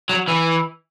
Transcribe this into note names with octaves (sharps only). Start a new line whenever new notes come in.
F#3
E3